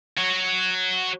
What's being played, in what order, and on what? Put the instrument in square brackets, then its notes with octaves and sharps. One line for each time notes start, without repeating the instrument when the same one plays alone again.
[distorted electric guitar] F#4 C#5